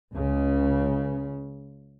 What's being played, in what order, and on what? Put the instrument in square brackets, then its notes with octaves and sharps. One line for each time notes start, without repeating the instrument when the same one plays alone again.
[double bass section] C#2 C#3